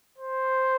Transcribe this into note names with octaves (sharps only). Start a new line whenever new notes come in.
C5